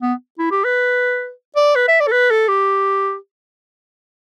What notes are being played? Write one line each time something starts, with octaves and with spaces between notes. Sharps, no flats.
B3
E4
G4
B4
D5
B4
E5
D5
A4
B4
A4
G4